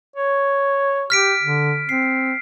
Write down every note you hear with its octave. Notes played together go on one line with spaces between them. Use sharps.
C#5
G4 F6 B6 D7
D3
C4 C7